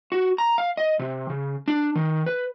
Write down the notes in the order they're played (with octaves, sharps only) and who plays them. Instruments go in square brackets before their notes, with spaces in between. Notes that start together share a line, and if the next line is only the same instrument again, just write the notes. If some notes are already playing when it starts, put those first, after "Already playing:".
[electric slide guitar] F#4
A#5
F5
D#5
C3
C#3
D4
D#3
B4